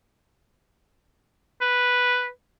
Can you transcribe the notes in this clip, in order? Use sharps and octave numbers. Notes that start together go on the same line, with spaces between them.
B4